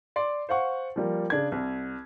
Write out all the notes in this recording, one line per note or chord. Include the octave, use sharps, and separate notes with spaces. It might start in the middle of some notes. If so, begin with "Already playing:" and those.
D5 C6
C5 F5 F#5 C#6
F3 G3 A#3
C#3 D4 G#6
C2